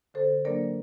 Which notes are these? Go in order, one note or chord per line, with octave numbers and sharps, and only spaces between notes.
D3 A4 C5
F#3 A#3 D4 A#4 D5